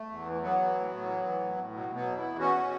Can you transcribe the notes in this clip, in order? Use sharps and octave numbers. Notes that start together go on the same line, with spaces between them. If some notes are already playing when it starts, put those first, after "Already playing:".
Already playing: A3
E2
E3
E3 F#3 B3
E3
A2
A2
E3
E3
A2
A2
B2 F#3
B2
F#3 B3
E2
B3 E4
E2
B2 C#4 F#4
B2